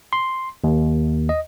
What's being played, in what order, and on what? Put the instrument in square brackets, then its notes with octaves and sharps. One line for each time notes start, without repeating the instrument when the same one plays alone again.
[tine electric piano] C6
D#2
D#5